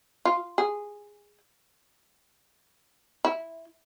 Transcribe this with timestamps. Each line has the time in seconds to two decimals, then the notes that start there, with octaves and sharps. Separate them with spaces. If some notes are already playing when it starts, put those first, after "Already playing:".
0.25 F4
0.58 G#4
3.25 E4